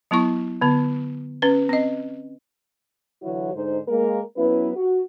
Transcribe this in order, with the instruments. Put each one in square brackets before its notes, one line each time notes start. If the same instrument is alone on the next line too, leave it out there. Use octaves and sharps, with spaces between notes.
[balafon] F#3 B3 E4 C#6
D3 B3
C#4 B4
C4 D#5
[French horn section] D3 E3 F#3 E4 F#4 C#5
G#2 D3 D#4 C5
G#3 A#3 A#4
F#3 B3 C#4 E4 B4
F#4